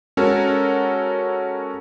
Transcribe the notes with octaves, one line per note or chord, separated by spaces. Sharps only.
G#3 C#4 F#4 A4 A#4 C#5